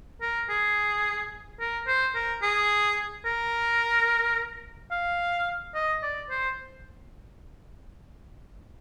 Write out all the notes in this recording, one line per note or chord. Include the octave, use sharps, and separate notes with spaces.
A#4
G#4
A#4
C5
A#4
G#4
A#4
F5
D#5
D5
C5